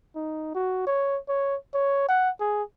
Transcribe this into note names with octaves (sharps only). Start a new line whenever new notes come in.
D#4
F#4
C#5
C#5
C#5
F#5
G#4